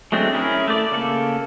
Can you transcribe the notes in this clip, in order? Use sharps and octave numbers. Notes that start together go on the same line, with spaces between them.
F#3 G#3 A3 C4 D4
C#4 E4 G#4 A#4
A3 D5
C#3 A#3 A4